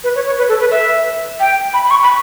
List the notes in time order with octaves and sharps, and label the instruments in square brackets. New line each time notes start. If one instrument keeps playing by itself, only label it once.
[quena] B4
C#5
C#5
B4
A4
B4
E5
G5
B5
B5
C#6
B5